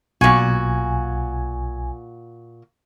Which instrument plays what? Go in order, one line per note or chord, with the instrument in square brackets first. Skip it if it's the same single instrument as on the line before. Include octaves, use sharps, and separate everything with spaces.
[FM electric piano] B1 G#5 [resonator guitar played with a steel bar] A#2 F#4